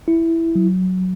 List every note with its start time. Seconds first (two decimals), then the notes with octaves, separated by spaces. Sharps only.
0.08 E4
0.55 F#3